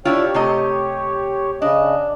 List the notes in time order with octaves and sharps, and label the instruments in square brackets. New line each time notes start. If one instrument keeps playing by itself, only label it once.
[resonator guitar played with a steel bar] D4 E4 F4 [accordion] G4 C#5
[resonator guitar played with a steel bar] C3 A3 D#5
[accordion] C#3 D#5 [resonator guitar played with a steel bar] D4